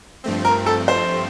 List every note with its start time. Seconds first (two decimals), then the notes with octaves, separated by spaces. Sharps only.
0.24 G2 F3 A3 C4
0.45 A#4
0.66 A4
0.88 C5